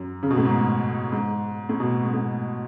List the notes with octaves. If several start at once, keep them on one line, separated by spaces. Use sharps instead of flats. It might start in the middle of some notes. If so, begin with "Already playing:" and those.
Already playing: F#2
C#3
B2
A2
G#2
G#2
A2
B2
G#2
A2